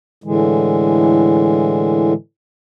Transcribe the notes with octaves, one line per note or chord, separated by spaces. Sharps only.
A2 D3 E3 G#3